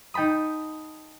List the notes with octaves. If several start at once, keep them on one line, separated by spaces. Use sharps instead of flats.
D#4 G5 A5 B5 D#6